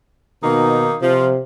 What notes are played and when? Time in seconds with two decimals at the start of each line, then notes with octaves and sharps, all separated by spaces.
0.43 B2 D#3 A#3 D#4
1.01 C3 F3